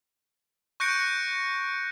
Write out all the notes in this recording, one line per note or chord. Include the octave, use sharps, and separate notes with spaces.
C#6 F#6 G6 A#6 C#7 D7